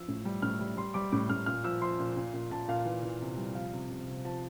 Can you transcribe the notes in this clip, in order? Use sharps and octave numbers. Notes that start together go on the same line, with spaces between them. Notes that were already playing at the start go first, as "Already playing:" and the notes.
Already playing: F3 E6
A2
G3
A2 F6
G3
G3 C6
G3 D6
A2 D6
A2 F6
A#2 F6
F3 E6
F3 C6
A#2
A#2
A#2
A#2 A5
A#2 F5
E3
E3
C3
G3
F3 F5
C3
C3
C3
F3 A5